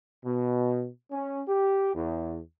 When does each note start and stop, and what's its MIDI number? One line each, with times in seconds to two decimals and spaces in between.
0.24 0.88 47
1.11 1.41 61
1.49 1.93 67
1.95 2.39 40